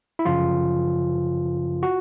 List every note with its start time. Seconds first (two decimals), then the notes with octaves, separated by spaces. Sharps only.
0.19 E4
0.25 G1 F#2 C#3 F3 F4
1.83 F#4